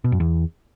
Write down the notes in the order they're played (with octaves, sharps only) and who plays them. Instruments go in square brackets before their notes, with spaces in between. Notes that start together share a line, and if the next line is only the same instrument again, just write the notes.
[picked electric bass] B2
F#2
E2